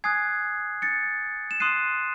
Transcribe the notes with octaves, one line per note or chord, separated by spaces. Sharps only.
G#5 D#6 F#6 G#6 C7
A6 C#7
E7
C6 D#6 F#6 C7 D#7